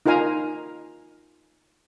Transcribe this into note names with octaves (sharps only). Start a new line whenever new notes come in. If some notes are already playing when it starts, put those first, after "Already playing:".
D#4 F4 A#4 F5 G#5 A#5